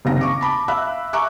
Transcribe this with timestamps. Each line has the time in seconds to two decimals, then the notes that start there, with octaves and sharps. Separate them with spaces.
0.05 F#1 C2 D#3 F5 A#6
0.21 C#6 D6
0.41 A5 B5 D6
0.68 E5 F5 B5 E6 F#6
1.13 E5 A#5 C#6 D6 F#6